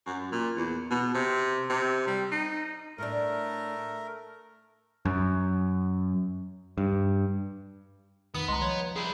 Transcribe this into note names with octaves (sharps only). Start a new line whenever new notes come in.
F#2
A#2
E2
B2
C3
C3
G3
D#4
A2 A3 D4 A#4
F#2
G2
F2 D#3 B3 D#6
C2 G#3 A#5 C6
F3 C#5
G3 E4 G#4